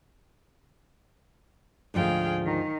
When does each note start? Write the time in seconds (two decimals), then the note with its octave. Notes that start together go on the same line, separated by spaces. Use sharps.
1.94 D2 G#2 F3 G#4 F5 G5
2.46 D#3